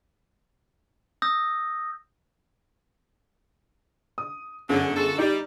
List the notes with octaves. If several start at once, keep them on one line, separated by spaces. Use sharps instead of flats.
D#6 E6 G6 A#6
D#6
G1 F#2 D3 F#3 G#4
F4 F#4 A4
G3 D#4